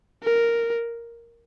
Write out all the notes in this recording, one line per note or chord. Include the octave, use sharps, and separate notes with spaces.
A#4